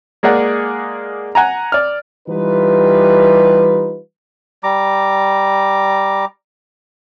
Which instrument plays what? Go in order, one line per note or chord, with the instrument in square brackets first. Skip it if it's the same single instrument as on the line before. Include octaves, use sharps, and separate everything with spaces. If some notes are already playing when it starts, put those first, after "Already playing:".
[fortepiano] G#3 A#3 G#4 D5 F#5
F#5 G#5 A#5
D5 F6
[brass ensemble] E3 G3 D#4 F4 G4 B4
[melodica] G3 A#5 D6